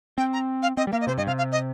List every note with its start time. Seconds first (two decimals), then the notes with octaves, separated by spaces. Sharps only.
0.18 C4 G5
0.33 A#5
0.63 F5
0.77 C4 D#5
0.87 G3
0.92 A#3 F5
1.01 D#5
1.07 C3 C5
1.18 G2 D#5
1.27 C3 F5
1.38 F5
1.52 D#5